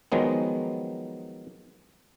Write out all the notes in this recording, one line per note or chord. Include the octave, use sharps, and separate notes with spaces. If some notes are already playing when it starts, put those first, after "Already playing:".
D#3 F3 F#3 G#3 B3